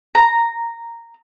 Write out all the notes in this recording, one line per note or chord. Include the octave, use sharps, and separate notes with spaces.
A#5